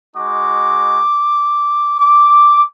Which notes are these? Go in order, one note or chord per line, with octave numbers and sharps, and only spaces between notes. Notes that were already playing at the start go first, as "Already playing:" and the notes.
G#3 D#4 F#4 D6
D6